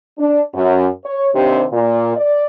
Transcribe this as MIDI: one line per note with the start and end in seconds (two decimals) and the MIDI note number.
0.18 0.41 62
0.54 0.87 42
1.04 1.28 73
1.34 1.64 39
1.34 1.64 48
1.34 1.64 60
1.34 1.64 62
1.34 1.64 67
1.34 1.64 72
1.72 2.12 46
2.16 2.46 74